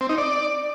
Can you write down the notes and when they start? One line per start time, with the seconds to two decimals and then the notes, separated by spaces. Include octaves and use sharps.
0.01 C4
0.09 D#4
0.18 D5